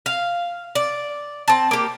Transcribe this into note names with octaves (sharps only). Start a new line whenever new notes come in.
F5
D5
C4 A5
A#3 G4